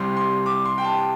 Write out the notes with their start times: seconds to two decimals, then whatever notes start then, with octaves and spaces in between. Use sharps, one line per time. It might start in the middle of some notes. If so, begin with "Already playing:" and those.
Already playing: C2 C3 G3 C6
0.17 C6
0.46 D6
0.65 C6
0.78 G5
0.84 A5